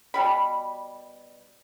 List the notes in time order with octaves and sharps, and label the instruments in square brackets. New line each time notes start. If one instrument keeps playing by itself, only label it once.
[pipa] B2 G3 B5